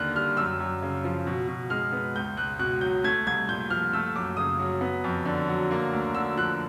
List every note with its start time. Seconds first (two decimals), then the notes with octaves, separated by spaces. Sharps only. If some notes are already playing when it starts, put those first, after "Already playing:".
Already playing: D#2 D3 A#3 F6 F#6
0.15 G3 F6
0.37 F#2 E6
0.60 F#2
0.83 C#3
1.04 F3
1.27 B2
1.48 B2
1.70 G#3 F6
1.93 B3
2.15 C#2 G6
2.37 C#2 F#6
2.59 B2 F#6
2.81 F#3 G6
3.04 A3 G#6
3.27 C2 G#6
3.49 A#2 G6
3.70 F3 F6
3.93 A3 E6
4.16 F#2 D6
4.37 C#3 D#6
4.59 F#3
4.81 B3
5.04 F2
5.25 D3
5.48 F#3
5.71 A#3
5.93 D2
6.15 D3 E6
6.37 F3 F#6